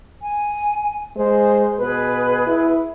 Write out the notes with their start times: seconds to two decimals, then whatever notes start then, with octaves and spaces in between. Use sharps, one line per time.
0.22 G#5
1.16 G#3 C5
1.79 B2 G#4 B4 B5
2.46 E4